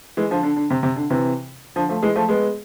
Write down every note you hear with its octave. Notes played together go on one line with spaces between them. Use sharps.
E3 G#3
D3 F3
D3
D3
C3
C3
D3
C3 E3
D3 F3
F3 A3
E3 G#3
F3 A3
G#3 B3